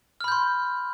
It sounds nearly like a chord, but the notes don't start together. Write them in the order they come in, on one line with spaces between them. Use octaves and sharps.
F6 B5 G6 C6